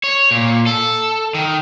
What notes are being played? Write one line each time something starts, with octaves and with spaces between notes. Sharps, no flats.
C#5
A#2
A4
D#3